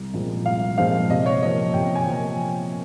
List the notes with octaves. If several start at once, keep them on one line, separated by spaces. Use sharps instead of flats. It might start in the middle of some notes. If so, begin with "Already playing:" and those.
Already playing: C2
A#2 F3 G#3 C4
C2 F5
A#2 F3 G#3 C4 F5
C3 D#5
C#5
F3 A#3 D#5
C3 G5
G#5
F3 A#3